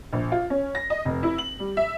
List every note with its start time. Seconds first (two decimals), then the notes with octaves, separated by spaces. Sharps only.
0.12 A#1
0.32 F4
0.50 C#4
0.75 A#6
0.90 D#5
1.05 F1
1.23 E4
1.38 F#7
1.59 G3
1.77 E5